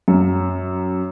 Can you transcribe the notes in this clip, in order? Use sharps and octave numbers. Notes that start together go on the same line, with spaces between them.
F#2